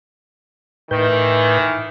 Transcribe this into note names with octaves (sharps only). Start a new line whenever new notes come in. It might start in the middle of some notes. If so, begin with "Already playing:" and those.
A2 D#3 E3 B4 G6